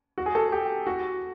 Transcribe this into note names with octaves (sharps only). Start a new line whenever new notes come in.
F#4
G#4
A4
G4
F#4